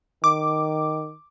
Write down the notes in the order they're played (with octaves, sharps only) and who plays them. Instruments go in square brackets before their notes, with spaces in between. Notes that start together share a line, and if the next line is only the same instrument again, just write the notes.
[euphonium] D#3 [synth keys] D6